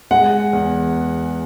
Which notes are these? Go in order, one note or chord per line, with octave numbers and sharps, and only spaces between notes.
G#3 F#5
E2